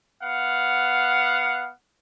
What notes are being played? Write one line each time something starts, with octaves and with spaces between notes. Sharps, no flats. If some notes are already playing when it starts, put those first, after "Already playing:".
B3 F5 F#5